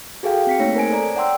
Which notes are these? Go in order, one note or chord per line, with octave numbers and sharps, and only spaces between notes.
F#4 G#4 A4 F5 G5
C4 B6 C#7
A3 A#3 D#4 C#5 A#6
A#4 C5 G#5 D7
A4 C5 D5 A#5
D5 F#5 G5 C6 E6